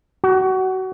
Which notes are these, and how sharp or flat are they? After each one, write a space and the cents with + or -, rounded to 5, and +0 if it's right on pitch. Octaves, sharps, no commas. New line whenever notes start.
F#4 +25